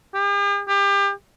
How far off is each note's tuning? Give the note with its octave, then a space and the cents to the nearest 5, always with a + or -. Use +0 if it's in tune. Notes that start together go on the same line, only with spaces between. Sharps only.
G4 +45
G4 +30